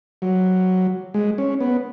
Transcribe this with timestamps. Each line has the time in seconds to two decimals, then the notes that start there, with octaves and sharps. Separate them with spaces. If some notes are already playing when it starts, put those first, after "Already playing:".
0.22 F#3
1.14 G#3
1.38 C#4
1.61 B3